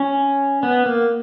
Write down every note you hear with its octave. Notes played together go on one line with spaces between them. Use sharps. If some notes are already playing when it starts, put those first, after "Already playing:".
Already playing: C#4
B3
A#3